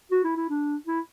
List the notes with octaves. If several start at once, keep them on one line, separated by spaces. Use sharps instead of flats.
F#4
E4
E4
D4
E4